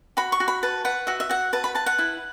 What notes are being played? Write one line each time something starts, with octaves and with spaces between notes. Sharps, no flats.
F#4 B5
C#6
F#4
B5
B4 A5
B4 F#5
F#4 E5
E5
F#4 F#5
B4 A5
B5
B4 A5
F#5
E4